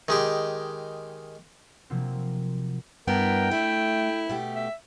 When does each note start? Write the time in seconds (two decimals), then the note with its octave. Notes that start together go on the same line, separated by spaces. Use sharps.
0.08 D#3 G#3 G4
1.90 C3 F3 F#3 A#3 C4
3.08 G2 B3 E4 A#4 G5
3.51 A3 E4
4.29 B2 A3 G4
4.55 E5